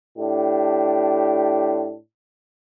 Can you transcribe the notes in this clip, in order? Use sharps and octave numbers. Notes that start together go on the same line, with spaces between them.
A2 D4 G4